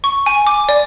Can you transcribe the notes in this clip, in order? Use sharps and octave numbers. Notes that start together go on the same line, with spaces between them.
C#6
G#5
D6
D5